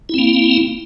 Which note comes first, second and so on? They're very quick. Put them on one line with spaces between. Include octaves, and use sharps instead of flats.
E4 C4 A#3